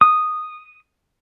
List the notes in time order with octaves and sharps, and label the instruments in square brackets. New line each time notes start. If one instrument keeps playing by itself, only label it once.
[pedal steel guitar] D#6